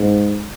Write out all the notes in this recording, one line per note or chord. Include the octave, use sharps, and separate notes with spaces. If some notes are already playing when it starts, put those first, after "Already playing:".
Already playing: G#2